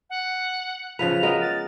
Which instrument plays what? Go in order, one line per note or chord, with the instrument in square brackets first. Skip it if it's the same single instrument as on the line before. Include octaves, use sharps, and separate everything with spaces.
[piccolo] F#5
[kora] C#3 F3 B4 [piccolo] F7
[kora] G#3 B3 A#4
[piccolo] A6